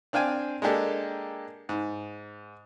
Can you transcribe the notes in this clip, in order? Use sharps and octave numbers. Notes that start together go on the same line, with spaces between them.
C4 D4 F5 G5 G#5
G#3 A#3 D4 G4 A4
G#2